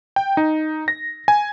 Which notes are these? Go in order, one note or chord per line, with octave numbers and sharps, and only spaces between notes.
G5
D#4
A#6
G#5